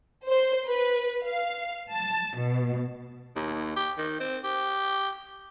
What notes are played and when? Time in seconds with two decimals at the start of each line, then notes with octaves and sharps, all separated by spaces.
0.26 C5
0.66 B4
1.27 F5
1.91 A5
2.38 B2
3.36 D#2
3.76 G4
3.98 D#3
4.20 C4
4.44 G4